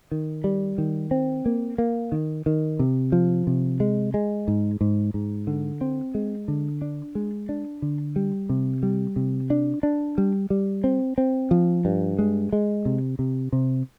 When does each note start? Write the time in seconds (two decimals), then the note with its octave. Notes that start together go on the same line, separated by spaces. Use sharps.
0.12 D#3
0.44 G3
0.78 D#3
1.11 C4
1.46 A#3
1.78 A#3
2.12 D#3
2.46 D#3
2.79 C3
3.12 F3
3.47 C3
3.80 G#3
4.14 G#3
4.48 G#2
4.81 G#2
5.14 G#2
5.47 D3
5.81 C4
6.15 G#3
6.48 D3
6.82 D4
7.15 G#3
7.49 D4
7.82 D3
8.16 G3
8.49 C3
8.83 G3
9.16 C3
9.50 D4
9.83 D4
10.18 G3
10.50 G3
10.84 C4
11.18 C4
11.51 F3
11.85 G2
12.19 G#3
12.53 G#3
12.85 C3
13.19 C3
13.53 C3